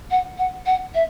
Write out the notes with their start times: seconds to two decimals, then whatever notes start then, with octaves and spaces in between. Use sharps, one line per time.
0.11 F#5
0.38 F#5
0.66 F#5
0.95 E5